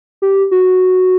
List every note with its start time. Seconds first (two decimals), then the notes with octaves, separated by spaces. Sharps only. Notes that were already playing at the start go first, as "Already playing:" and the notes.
0.22 G4
0.51 F#4